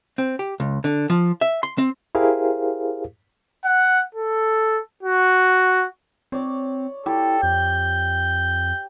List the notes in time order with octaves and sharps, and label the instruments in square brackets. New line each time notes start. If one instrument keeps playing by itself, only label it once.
[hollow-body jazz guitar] C4
G4
C#2
D3
F3
E5
C6
C4
[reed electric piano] E4 G4 G#4 A#4 C5 F5
[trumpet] F#5
A4
F#4
[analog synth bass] C4 [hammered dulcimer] C#5 D5
[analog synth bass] E4 [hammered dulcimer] G4 [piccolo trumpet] A4
[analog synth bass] F2 [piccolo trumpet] G6